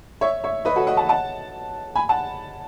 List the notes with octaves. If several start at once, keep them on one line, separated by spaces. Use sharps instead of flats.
C#5 E5
C#5 E5
B4 D#5
F#4 A4
D#5 F#5
F#5 A5
F#5 A5
G#5 B5
F#5 A5